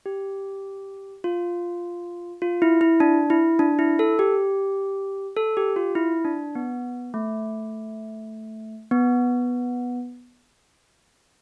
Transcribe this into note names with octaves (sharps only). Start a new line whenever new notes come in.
G4
F4
F4
E4
E4
D4
E4
D4
E4
A4
G4
A4
G4
F4
E4
D4
B3
A3
B3